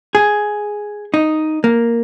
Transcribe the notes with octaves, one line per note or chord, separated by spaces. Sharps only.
G#4
D#4
A#3